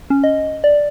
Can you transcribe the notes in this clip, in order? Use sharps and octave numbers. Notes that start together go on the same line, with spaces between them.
C#4
D#5
D5